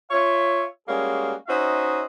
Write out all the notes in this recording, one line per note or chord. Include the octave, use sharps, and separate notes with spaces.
F4 C#5 E5
G3 G#3 A#3 C#4 F#4 G#4
C#4 D#4 F#4 C5 D#5 E5